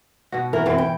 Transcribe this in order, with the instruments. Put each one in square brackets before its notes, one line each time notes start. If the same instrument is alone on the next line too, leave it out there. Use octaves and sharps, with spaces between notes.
[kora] B2 F#4
[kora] E3 F#4 [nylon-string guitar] A#4
[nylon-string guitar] F#2 C4 [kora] E3
[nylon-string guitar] G5